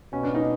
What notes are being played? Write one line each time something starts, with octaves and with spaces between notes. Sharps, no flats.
B2 C#4
D4
D#4